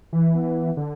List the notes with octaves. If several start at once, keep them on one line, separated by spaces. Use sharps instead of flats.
E3
B3
D3